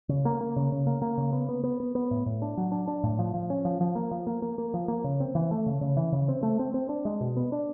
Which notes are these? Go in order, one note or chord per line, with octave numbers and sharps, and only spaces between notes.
C#3
A#3
A#3
C#3
C#3
A#3
A#3
C#3
B3
B3
B3
B3
B3
A2
A2
D4
F#3
D4
D4
A2
F3
F3
C#4
F3
F3
A#3
F3
A#3
A#3
A#3
F3
A#3
C#3
C4
E3
A3
C#3
C#3
E3
C#3
C4
A3
C4
C4
D4
G#3
B2
B3
D4